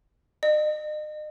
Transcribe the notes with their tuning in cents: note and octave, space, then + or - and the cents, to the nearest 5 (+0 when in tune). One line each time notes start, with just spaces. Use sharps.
D#5 -40